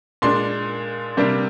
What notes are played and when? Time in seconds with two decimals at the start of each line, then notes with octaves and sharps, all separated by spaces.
0.22 A#2 G#3 D4 C6
1.17 C3 G3 A#3 D4